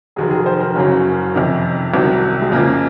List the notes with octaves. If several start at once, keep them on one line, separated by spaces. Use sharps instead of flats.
F1 D#2 D#3 F#3 G#4
G#4
C5
A#4
F#1 F#2 C#3 F#3 C#4
F2 C3 D#3
C2 C3 D#3 F#3
G#3
F2 C#3 F3 A#3